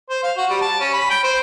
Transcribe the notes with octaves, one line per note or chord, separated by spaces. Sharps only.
C5
F5
F#4
G3
A5
C#4
B5
G5
C5